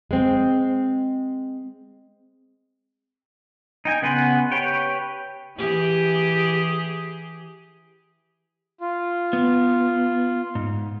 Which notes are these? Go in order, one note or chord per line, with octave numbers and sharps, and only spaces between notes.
G#3 C4
D#4 G5 G#5
C#3 B3 F#5 G#5 C6
G4 B4 C#5 G5
E3 G4 G#4
F4
B3
G#2